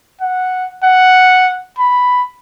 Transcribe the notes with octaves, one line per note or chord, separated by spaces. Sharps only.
F#5
F#5
B5